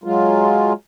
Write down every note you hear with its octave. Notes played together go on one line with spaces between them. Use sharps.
F#3 G#3 F4